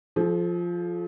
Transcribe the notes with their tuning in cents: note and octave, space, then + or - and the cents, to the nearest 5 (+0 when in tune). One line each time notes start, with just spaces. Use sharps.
F3 +0 A4 -45